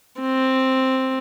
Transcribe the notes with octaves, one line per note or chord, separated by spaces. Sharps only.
C4